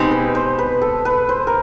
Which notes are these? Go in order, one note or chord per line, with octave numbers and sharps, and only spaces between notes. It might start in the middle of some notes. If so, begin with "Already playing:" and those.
Already playing: B2 G#3 C4 D#4 G4
B4
C5
B4
A4
B4
C5
A#4